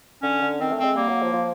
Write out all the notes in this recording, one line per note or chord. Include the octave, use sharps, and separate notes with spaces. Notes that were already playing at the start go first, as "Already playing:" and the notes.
D3 C#4
D3
D#3 C4
A3
C4
G#3
G3 A#3
F#3
F3
F3